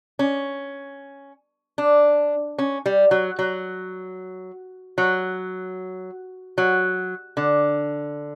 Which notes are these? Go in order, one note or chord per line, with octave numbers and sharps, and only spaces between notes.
C#4
D4
C#4
G3
F#3
F#3
F#3
F#3
D3